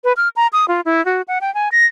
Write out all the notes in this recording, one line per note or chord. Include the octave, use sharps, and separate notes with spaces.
B4
F6
A#5
D#6
F4
E4
F#4
F#5
G5
G#5
A#6